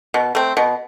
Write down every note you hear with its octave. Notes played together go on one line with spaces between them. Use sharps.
B2
A3 C4
B2